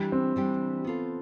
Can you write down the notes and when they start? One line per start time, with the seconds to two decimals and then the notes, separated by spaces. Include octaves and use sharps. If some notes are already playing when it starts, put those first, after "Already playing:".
Already playing: E3 G3 D4 G4
0.12 C4
0.36 E3 G3 D4 G4
0.84 B3 F4 A4